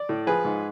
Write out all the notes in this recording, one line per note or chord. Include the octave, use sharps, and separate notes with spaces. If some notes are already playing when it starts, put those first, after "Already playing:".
Already playing: D5
A2
F3 G#4 B4
G#2